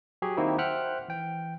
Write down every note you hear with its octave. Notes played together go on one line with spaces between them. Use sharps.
F#3 G4 G#4 C#5
D#3 A#3 C4 D#4 E4 F#4
C5 E5 F#5 G5 F6 F#6
E3 G5